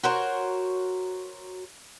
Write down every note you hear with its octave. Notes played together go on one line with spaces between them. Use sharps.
F#4 A#4 C5 C#5